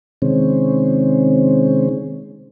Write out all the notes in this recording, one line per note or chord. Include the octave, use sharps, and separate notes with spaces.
C3 D#3 G#3 C4 C#4